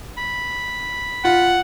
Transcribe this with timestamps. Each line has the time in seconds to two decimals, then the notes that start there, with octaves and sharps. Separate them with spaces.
0.18 B5
1.25 F4 F#5